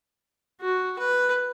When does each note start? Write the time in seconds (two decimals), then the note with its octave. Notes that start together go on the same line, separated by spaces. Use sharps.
0.61 F#4
0.98 B4